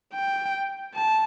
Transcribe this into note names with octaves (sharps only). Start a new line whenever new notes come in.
G5
A5